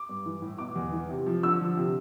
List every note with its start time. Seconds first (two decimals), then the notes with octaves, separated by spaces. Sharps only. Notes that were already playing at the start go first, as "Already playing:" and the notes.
Already playing: D6
0.09 G2
0.26 E3
0.42 A2
0.58 B2 D6
0.75 E2
0.92 E3
1.10 C3
1.26 F3
1.43 D3 E6
1.60 F3
1.77 C3